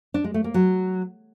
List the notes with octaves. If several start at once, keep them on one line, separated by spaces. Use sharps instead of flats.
D4
G#3
A3
A#3
F#3